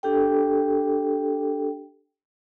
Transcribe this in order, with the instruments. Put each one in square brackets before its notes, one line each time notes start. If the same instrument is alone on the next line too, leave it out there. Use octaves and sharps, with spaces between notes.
[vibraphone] D4 G4 A4 G5